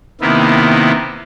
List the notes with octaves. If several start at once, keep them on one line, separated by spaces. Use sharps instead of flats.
C3 D#3 A#3 B3 E4